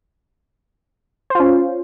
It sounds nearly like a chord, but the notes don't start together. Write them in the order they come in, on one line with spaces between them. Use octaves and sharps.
C5 F4 C#4